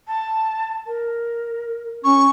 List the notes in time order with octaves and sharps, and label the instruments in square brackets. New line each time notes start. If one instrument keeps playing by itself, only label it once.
[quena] A5
A#4
[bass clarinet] C#4 [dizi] C#6